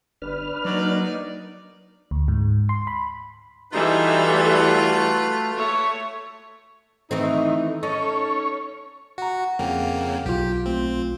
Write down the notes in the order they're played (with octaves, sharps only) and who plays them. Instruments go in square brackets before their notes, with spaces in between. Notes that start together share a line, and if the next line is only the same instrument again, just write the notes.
[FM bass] G1 [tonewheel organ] D4 B4 F6
[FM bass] F#3 [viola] A#3 D#4 [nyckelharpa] D5
[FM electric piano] D2
G#2
C6
B5
[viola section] E3 G3 A4 [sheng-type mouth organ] D#4 [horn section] F4 F#4 B4
[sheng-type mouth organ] A3
[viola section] A3 C#5
[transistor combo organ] D#3 [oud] E3 A3 C4 [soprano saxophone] D#4
[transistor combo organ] C#4 C#5 [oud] D#4 [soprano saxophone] A4
[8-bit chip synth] F#4 [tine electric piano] F#5 A#5
[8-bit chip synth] F2 C#3 A#3 [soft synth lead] G5
[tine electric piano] B1 F4 [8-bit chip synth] G4
[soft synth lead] A3 [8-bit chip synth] C4